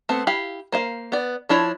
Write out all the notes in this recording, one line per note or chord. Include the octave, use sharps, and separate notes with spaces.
A3 B3 C4
E4 G4 F5 B5
A#3 C5 F5
B3 D5
F3 D4 E4 C#5